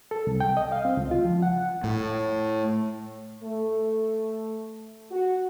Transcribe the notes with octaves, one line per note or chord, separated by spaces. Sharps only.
A4
C2
G5
D#5
F5
C4
C#2
F4
F3
F#5
A2
A3
F#4